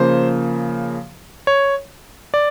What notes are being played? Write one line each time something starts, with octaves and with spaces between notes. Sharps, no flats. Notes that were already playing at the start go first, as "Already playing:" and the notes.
Already playing: C#3 F3 A#3 C5
C#5
D5